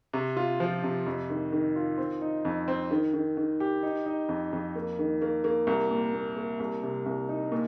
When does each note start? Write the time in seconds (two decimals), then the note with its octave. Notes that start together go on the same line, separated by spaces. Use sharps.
0.13 C3
0.37 F4
0.60 F3
0.84 C3
1.06 F2
1.30 D#3
1.52 D#3
1.76 F4
1.98 C4
2.22 D#4
2.45 F2
2.68 C4
2.91 D#3
3.14 D#3
3.37 D#3
3.60 G4
3.83 D#4
4.06 D#4
4.29 F2
4.53 F2
4.75 A#3
4.99 D#3
5.22 A#3
5.44 A#3
5.67 C2
5.91 A#2
6.14 A#2
6.36 A#3
6.60 C2
6.83 C3
7.06 C2
7.29 D#4
7.52 A#2